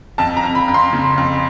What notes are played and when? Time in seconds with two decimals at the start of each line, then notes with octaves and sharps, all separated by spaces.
0.18 F2 A5
0.37 A#5
0.43 F2
0.55 B5
0.68 F2
0.74 C6
0.93 C#3
1.18 F2